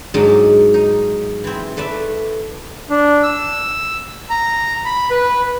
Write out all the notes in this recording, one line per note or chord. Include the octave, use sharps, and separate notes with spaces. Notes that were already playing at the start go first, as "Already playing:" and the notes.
G#2 F#3 G#3 D4 D#4
D#4
E3 C4
A3 B4 D5 E5
D4
E6
A#5
B5
B4